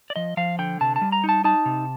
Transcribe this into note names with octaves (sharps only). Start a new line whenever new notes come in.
D5
F3 D#5
F3 F5
D3 G5
C3 A5
A5
G3
A#5
D#4 A5
D#4 A5
C3